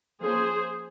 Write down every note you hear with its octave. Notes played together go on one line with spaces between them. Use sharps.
F3 A#3 C#4 G#4 C5